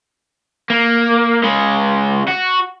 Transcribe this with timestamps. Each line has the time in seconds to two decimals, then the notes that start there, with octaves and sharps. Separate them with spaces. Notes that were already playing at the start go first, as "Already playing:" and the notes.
0.70 A#3
1.44 C#3 G#3
2.28 F#4